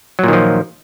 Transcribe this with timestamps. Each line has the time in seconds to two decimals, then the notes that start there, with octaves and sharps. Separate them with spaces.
0.19 F#3
0.24 A#2
0.28 D#3
0.33 F3